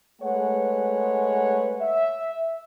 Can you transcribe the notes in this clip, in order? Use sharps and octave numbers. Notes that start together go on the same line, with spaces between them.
G#3 A3 B4 C#5 F#5
E5